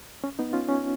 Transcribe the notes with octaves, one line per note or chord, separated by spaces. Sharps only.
C#4
B3 D#4
C#4 F4
C#4